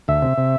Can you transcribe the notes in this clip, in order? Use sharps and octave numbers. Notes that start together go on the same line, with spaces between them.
D2 E5
C3
C3